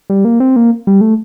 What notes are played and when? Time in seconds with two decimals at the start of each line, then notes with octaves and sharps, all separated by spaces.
0.10 G3
0.25 A#3
0.40 C4
0.56 A#3
0.87 G3
1.01 A3